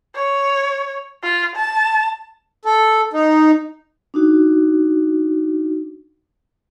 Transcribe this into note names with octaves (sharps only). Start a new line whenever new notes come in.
C#5
F4
A5
A4
D#4
D4 D#4 F#4